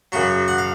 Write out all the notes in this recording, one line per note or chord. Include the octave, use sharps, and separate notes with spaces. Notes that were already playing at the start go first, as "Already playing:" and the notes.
F#2 C#3 F#3 F#4
F#5
F5